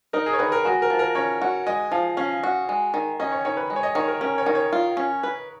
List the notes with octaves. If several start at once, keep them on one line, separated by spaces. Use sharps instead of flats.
D#4 A#4
G#4
C#5
D#3 B4
A#4
G#3 F#4
A#4
F3
A#4
C#4 C#5
F#4
G#3 D#5
F3 F5
C#4 F5
F#4
G#3
D#3
C#4 D#5
C#5
D#3 C#5
B4
G#3
C#5
D#5
D#3 C#5
A#4
C#4 A#4
C#5
D#3
C#5
F4
C#4
B4